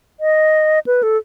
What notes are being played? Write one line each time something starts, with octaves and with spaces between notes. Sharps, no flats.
D#5
B4
A4